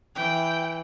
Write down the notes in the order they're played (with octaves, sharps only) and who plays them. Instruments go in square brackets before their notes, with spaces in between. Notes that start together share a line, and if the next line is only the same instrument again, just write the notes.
[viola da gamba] E3 [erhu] G5